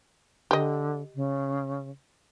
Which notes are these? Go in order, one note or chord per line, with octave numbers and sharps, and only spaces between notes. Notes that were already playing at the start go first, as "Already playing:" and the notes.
D3 G4 D#5
C#3